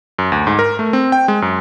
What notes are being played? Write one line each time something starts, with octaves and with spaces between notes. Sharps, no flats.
F#2
D2
G#2
A#4
A3
C4
G5
G#3
F#2